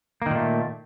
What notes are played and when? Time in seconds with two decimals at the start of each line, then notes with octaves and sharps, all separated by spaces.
0.22 A#3
0.26 D#3
0.31 A#2
0.35 A3